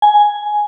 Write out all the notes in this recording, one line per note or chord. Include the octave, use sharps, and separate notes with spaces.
G#5